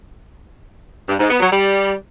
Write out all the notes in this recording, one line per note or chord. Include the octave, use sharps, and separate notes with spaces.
G2
G#2
B3
F#3
G3